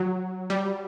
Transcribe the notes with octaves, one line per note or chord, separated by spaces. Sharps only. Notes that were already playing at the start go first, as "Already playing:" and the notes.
Already playing: F#3
G3